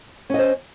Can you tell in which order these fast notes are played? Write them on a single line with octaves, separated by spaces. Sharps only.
C#4 D#5 C5